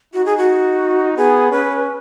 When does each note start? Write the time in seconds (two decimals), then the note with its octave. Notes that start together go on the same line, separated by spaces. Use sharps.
0.14 D#4 F#4
0.26 G#4
0.38 F#4
1.17 B3 G#4
1.51 C#4 B4